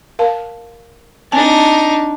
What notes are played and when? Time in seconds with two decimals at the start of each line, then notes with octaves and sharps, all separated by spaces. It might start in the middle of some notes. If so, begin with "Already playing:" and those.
0.19 A#4 F5 A5
1.32 C4 D4 D#4 G#5 A5